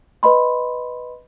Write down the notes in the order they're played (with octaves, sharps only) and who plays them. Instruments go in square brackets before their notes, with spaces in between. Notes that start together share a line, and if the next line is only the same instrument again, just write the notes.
[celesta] B4 D#5 B5 C6